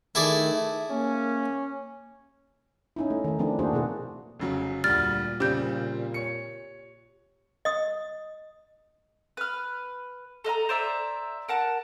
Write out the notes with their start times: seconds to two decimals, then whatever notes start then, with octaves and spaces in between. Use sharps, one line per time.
0.15 D#3 A3 E4 G#4 D5
0.54 E5
0.91 A#3 C#4
2.96 C#4 D#4 E4
3.10 A3
3.24 D#3 A3
3.39 F3 A3 C4 D4 E4
3.59 A#3 D4 F#4 G#4 C5
3.73 B2 B3 E4 G#4
4.40 F1 C#3 F#3
4.84 D2 A#2 G3 F6 A6
5.40 C#3 G3 C4 G4 G6
6.14 C#5 C#7
7.65 D#5 D#6
9.37 B4 F6
10.44 A4 D#5 F5 A#5
10.69 C5 D5 E5 A#5
11.49 A#4 F#5 A5